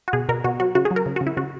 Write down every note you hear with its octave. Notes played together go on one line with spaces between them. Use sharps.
F#4
B2 G#4
B2 A#4
B2 F#4
F#3 F#4
C#3 F#4
G#4
F#3
A#4
C#3
F#4
C#3
E4
C#3 F#4